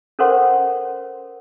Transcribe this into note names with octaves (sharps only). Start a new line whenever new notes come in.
C#4 A4 A#4 C5 F#5 C6